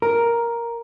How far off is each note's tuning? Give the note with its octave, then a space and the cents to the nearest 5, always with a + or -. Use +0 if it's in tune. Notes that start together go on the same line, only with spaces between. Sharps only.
A#4 +5